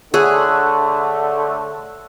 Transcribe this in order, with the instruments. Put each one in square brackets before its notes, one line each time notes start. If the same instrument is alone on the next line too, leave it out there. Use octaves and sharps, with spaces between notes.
[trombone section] D3 A3 [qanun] G#4 [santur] C#5 E5 F#5